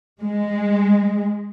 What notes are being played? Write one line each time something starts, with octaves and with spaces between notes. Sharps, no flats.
G#3